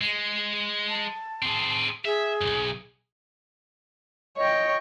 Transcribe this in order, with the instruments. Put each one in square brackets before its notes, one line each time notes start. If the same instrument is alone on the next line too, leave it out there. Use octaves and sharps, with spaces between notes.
[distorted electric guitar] G#3
[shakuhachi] A5
[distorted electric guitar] C4 G#4
[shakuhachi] G#4 [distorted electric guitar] E5
[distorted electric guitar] B1 F#2
[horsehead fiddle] C#5 G5 [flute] D#5